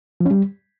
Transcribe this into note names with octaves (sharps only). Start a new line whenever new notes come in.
F3
C#4
G3